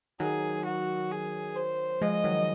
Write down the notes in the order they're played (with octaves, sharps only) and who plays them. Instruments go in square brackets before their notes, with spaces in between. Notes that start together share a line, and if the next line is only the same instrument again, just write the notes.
[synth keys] D#3 F#3 [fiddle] G#4
[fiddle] F#4
G#4
C5
[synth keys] F3 G#3 [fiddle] D#5
[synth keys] D#3 F#3